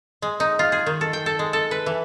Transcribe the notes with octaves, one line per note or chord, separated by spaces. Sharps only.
G#3
D#4
F4
G#4
D#3
A4
G5
A4
G#3
A4
B4
E3